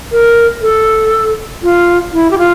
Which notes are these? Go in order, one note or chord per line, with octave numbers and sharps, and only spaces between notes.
A#4
A4
F4
E4
G4
F4